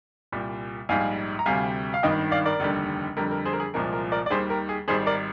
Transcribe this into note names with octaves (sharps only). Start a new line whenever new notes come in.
C2 A#2 G3
A#1 G#2 G3 F5 G#5
A#5
D2 C3 G3 F5 G#5
F5
G#1 G2 D#3 D#5 G5
D5 F5
A#4 D5
F1 D#2 D3 G3
F2 D3 G3 A#4
A#4
G#4 C5
A#4
G#4
C2 A#2 F3 G#3 A#4
A#4
A#4 D5
D5
D#2 D#3 G3 G#4 C5
A#4
G#4
G#1 G#2 G3 G#4 C5
A#4 D5